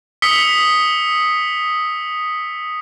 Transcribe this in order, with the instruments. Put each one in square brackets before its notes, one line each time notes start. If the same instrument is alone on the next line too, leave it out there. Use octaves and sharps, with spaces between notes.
[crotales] D#6 E6 B6 C#7 G7